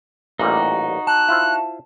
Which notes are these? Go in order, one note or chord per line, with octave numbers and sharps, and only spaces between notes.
A1 A#2 G3 D#4 F#4
A5 F#6
E4 F4 C5